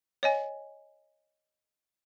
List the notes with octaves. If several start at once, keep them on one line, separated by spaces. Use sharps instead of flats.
C#5 D#5 G#5